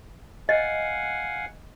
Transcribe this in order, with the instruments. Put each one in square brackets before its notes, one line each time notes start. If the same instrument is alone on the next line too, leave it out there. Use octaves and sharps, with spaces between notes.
[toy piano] D#5 [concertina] F5 F#5 G#5